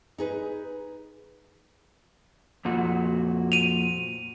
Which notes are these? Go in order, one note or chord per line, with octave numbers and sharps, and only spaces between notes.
D#4 G#4 B4
F2 A#2 F#4
D#7 F7